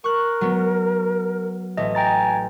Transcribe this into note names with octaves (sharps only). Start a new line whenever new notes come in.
A#4 C#6 F#6
F#3 B3
A1 D#5 E5
G5 G#5 A#5 A6